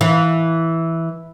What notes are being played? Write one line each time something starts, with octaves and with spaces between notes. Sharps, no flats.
E3